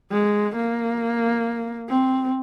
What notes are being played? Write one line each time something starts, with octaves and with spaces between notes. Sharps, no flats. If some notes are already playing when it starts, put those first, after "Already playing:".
G#3
A#3
C4